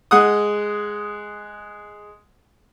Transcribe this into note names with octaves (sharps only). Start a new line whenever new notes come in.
G#3 F#5 D#6